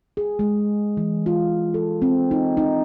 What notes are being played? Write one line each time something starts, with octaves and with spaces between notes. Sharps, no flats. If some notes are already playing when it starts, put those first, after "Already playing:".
G#4
G#3
E3
F4
A4
C4
D#4
D#4